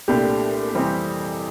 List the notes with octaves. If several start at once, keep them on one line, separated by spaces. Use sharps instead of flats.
C2 A#2 A3 D4 G4
F2 C3 E3 G3 C4